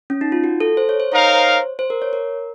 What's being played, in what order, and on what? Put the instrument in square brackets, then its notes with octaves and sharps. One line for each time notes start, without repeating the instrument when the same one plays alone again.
[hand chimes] C#4
D#4
F4
F#4
A4
C5
C#5
C5
[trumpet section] D#4 A#4 F5 [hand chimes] C#5
[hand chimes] C#5
C5
C5
A#4
C#5
A#4